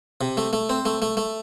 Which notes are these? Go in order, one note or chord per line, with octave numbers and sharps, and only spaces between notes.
C3
A3
A3
C4
A3
A3
A3